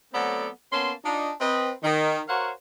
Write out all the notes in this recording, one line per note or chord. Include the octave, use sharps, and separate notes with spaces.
F#3 A3 B3 C4 A4 D5
A#3 B3 C#4 A5 C6
D4 D#4 F4
C4 B4 D#5
D#3
F#4 A#4 C5 C#5 F5 F#5